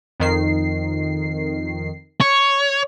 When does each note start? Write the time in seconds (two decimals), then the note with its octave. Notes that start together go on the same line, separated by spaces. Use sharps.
0.20 F2 D#3 C7
2.20 C#5